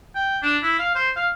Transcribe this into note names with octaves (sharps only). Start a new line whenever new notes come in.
G5
D4
E4
F5
C5
F5